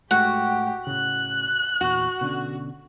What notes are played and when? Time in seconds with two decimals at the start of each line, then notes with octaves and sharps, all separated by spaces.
0.11 A2 G#3 A3 F#4 G4 F#5
0.87 A2 C#3 F#6
1.81 E2 A#2 F#4
2.21 B2 D3 C#4